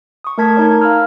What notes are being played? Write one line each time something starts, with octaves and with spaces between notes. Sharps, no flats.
C#6 D#6
A3 A#4 A5 G#6 B6
D#4 C#5
F5 A#5 B5 E6 F6